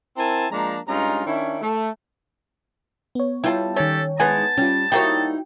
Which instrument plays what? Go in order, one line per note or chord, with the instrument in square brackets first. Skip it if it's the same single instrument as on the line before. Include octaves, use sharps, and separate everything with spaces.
[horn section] C4 E4 A#4 G#5 A5
F3 G#3 A#3 D4 A#5
G2 G#3 C#4 D#4 F4 A#5
D#3 C#4 D4 E4
A3
[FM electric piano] B3 C#5
[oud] G3 [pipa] E4 F4 A5
[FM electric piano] D#3 C#5 [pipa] C#4 [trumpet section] G4 A4
[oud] G#3 D#4 E4 [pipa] B3 G#5 [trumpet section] A5
[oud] G3 [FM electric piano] C#4 F4
[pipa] G3 A#3 [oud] D#4 E4 C#5 [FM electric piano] F#4 G5